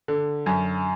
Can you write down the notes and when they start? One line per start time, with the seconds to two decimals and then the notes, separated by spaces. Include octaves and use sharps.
0.08 D3
0.46 F#2